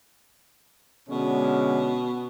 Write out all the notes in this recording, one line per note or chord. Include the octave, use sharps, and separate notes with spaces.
B2 D3 G#3 C#4